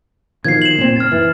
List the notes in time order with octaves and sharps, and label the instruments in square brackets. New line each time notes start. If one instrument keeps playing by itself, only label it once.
[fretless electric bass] B2 D#3 F3 [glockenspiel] G#6 C7
[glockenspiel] E7 F#7
[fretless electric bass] A#2 C4
[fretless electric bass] F#1 [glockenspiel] F6 A6
[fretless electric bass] E3